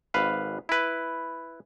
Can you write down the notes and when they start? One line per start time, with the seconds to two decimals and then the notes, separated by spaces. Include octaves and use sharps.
0.14 G#1 B4 F5
0.69 E4 B4